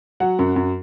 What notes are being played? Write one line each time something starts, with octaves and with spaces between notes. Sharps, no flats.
F#3 F#5
F#2
F#2